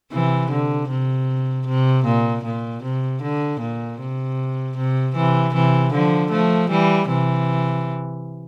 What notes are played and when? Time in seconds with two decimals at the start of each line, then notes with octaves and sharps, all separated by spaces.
0.12 C3 E3
0.51 D3
0.89 C3
1.67 C3
2.06 A#2
2.45 A#2
2.83 C3
3.22 D3
3.60 A#2
4.00 C3
4.77 C3
5.16 C3 E3
5.54 C3 E3
5.93 D3 F3
6.32 F3 A3
6.70 E3 G3
7.09 C3 E3